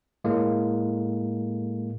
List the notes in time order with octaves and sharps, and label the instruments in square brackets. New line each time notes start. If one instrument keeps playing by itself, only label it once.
[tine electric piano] A2 G#3 A#3